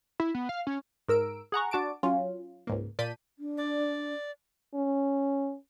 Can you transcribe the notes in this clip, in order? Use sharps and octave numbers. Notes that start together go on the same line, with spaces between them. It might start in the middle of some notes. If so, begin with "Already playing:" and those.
E4
B3
F5
C#4
G#2 A#4 E6 D7
G#4 F#5 A#5 C#6
D4 F#4 A5 D6 D7
F#3 C#4 F4
C#2 G#2 A#3
A#2 D5 A5 G6 B6 D#7
D4
D5
C#4